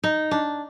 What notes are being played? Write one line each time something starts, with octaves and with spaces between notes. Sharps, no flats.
D#4
D4